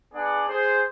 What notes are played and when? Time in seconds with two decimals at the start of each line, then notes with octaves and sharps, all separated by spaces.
0.13 B3 D4 G#4 D5 F#5
0.49 G#4 C5